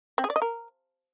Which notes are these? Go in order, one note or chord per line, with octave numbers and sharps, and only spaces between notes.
C4
G#4
D5
D#5
A#4